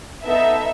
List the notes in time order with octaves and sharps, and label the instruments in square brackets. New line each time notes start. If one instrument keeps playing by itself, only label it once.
[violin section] B3 D#4 A4 E5